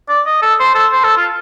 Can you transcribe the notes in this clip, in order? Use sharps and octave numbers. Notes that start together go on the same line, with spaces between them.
D5
D#5
A4
C5
A4
C5
A4
F4